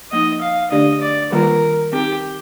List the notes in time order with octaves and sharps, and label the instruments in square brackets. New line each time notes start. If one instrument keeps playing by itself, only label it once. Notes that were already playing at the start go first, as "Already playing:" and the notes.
[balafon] F3 A#3 D#4 [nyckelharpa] D#5
[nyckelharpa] F5
[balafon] D3 A3 D4 G4 D5 [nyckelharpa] D#5
[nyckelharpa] D5
[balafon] D#3 G3 A#3 F4 [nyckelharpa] A#4
[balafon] C4 D#4 A#4 [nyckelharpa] G4